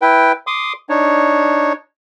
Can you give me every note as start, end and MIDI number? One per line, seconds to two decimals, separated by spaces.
0.02 0.32 64
0.02 0.32 71
0.02 0.32 79
0.47 0.73 84
0.47 0.73 86
0.47 0.73 87
0.89 1.73 62
0.89 1.73 63
0.89 1.73 73